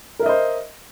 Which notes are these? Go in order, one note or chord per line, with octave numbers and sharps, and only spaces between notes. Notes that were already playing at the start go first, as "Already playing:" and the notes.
A#4 C5 D#5 E5